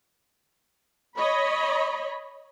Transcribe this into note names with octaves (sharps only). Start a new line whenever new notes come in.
C#5 D#5 B5